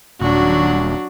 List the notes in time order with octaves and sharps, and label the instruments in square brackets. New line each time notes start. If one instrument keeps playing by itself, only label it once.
[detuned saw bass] D#1 [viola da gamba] F#3 D4 F#4